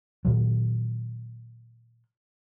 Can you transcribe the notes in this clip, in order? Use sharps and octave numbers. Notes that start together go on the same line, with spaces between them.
A#2 D#3 F#3